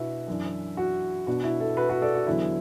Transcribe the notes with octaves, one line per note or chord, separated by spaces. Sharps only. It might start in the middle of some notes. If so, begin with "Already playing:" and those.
Already playing: B2 B3 D4 E4 F#4
F#2 E3 D4
F#4
B2 B3 D4 F#4
E4
E4 A4
F#4 B4
F#4 B4
A4 D5
F#4
E2 D3 F#3 B3 E4